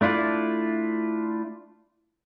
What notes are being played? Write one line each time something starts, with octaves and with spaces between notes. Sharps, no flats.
A3 D4 E4 F4 D5